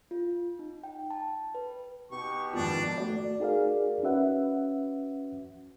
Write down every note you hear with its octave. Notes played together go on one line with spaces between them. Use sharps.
F4
D#4
G5
A5
B4
B2 D#4 G4 C#6
F2 G#2 D#3 G#3 B3 D4 F4
A3 F#4 D5
D#4 F#4 G#4 A#4 D5 F5
C#4 F#4 B4 E5 F#5